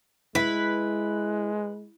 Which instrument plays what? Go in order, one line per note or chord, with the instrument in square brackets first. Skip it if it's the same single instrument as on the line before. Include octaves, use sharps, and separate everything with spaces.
[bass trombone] G#3 [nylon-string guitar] E4 [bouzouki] B4